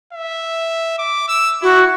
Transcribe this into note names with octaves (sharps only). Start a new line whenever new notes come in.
E5
D6
E6
E4 F#4